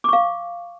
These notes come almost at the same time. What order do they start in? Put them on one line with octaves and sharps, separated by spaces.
D6 C#6 F5